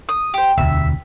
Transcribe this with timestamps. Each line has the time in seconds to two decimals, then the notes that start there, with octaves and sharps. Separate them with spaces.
0.09 D#6
0.34 G4 C5
0.58 E1 D2 E5